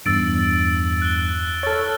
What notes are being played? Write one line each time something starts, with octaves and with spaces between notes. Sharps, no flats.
E2 G2 E6 A6 D7
F#6 G7
A4 C#5 F6 A6